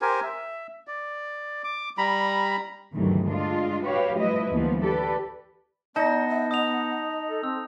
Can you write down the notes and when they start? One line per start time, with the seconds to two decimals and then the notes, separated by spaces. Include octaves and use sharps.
0.02 G4 A#4 C5 G#5
0.23 E5
0.87 D5
1.64 D6
1.98 G3 A#5 B5
2.94 D2 G2 C3 D#3 E3 F#3
3.28 G#3 D4 F4 D#5
3.85 F#4 G4 B4 C#5 F5
4.17 F3 G3 A3 E4 B4 D#5
4.52 D2 E3 F3 G3 A#3 B3
4.83 G4 A4 B4 D5
5.96 B3 D#4 D5 A5 A#6
6.29 E5
6.51 D#5 D#6 F7
7.29 A4
7.43 C4 E6